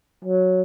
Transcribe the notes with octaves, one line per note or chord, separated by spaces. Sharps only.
F#3